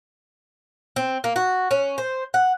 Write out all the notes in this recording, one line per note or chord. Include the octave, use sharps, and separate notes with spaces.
C4
A#3
F#4
C#4
C5
F#5